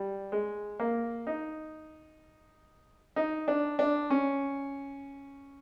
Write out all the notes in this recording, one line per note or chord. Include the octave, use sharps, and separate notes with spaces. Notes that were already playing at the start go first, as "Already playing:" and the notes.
Already playing: G3
G#3
A#3
D#4
D#4
D4
D4
C#4